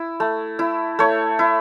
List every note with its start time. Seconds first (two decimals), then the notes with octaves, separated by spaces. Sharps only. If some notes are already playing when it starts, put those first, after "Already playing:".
Already playing: E4
0.20 A3
0.59 E4
0.99 A3 C#5
1.39 E4